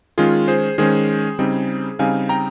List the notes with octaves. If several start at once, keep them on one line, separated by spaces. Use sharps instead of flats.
D#3 G#3 C#4 F4 G#4
G#4 C5
D#3 G#3 C#4 G#4 C5
C#3 G3 C4 D#4
C#3 G3 C4 D#4 F5 G#5
G5 A#5